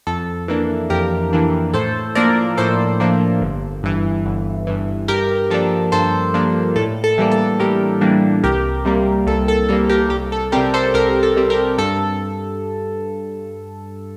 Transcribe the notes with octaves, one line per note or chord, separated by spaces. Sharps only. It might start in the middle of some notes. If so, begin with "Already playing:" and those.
F2 A4
E3 A#3 D4
F2 G4 A#4
E3 A#3 D4
A2 A4 C5
F3 A#3 D4 A#4 D5
A2 A4 C5
F3 A#3 D4
G1
G2 E3
G1
G2 E3
G2 G4 A#4
F3 A#3 D4 A4
G2 A4 C5
F3 A#3 D4
A2 A4
A4
E3 G3 A#3 D4
A4
A2 G4 A#4
E3 G3 A#3 D4
C2 G4 A#4
C3 G3 A#3
C2 A4
A4
C3 G3 A#3 A4
G4 A#4
C2 G4
A4
C3 G3 C4 G4 A#4
A4 C5
C2 G4 A#4
A4
C3 G3 C4
G4 A#4
G2 A4